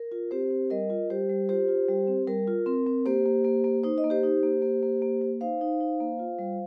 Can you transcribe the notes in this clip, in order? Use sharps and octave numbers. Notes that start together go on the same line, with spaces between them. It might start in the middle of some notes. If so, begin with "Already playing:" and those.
Already playing: A#4
F4
C4 G4 C5
C4
G3 A#4 D#5
F4
G3 G4 C5
G3
F4 G4 C5
F4
G3
C4
G3 A#4
F4
C4 A#4
C4
A#3 G4 C5
A#3
A#3
A#3
D#4 C5
D#5
A#3
G4 C5
D#4
A#3
A#3
A#3
A#3
A#3
D#4 C5 F5
D#4
D#4
A#3
F4
G3